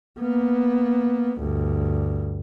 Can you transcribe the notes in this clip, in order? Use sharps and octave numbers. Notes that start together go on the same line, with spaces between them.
A#3 B3
D2 G2